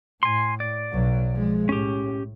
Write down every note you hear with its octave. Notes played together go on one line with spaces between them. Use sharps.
A2 G#5 C6
D5
B1 F#3
F3 G#3
A2 C#4 G4